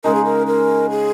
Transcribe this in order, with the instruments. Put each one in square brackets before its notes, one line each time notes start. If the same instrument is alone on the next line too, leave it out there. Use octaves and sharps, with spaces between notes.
[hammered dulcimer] C#3 G#3 D#4 [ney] A#4
[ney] G#4
A#4
A#4
G#4